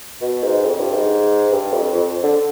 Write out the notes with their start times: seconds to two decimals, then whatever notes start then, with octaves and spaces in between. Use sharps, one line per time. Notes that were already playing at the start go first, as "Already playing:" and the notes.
0.21 B2
0.43 G#2
0.65 F2
0.79 G2
0.94 G#2
1.52 G2
1.73 F2
1.94 F2
2.23 D3